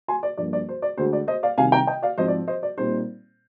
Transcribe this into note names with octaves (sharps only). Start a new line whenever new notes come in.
G#5 C6
D5
G2 F3 A#3 D5
D5
C5
D5
D2 D3 G#3 C5
D5
C5 D#5
D5 F5
C2 C3 D#3 F5 G#5
G5 A#5
D#5 G5
D5 F5
G#2 F3 C4 C5 D#5
D5
C5 D#5
D5
A#2 G3 C4 D#4 C5